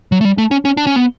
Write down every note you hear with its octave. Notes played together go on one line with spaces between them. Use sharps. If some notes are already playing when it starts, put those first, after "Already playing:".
F#3
A3
G3
A3
C#4
C#4
D4
C#4
B3